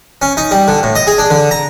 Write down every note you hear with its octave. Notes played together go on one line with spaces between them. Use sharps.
C#4
D#4
G3
D3
A2
D#5
G#4
D4
D3
A#5